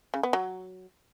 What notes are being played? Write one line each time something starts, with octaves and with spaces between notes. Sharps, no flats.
C#3
B3
F#3